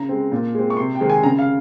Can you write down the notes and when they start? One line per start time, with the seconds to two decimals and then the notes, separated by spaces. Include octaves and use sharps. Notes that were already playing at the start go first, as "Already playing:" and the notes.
Already playing: C#3 A#5
0.09 G#3 C4
0.32 A#2
0.55 G#3 C4
0.70 C#6
0.77 C3 C6
0.95 G5
1.01 D#3 G#3 C4
1.10 G#5
1.23 C#3 A#5
1.39 F5